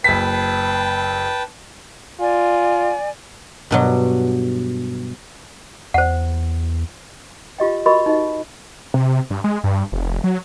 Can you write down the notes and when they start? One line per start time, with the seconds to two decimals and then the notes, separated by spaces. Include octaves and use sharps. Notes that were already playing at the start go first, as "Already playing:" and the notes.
0.04 F#1 B4 G5 A5 B6
2.20 F4 D5 G#5
3.71 G2 B2 F#3
5.94 E2 C5 F#5
7.59 F4 G4 D#5 G5
7.86 F#4 A#4 D#5 B5 C#6
8.06 D#4 D#5
8.94 C3
9.30 G2
9.44 G#3
9.64 G2
9.92 F1
10.24 F#3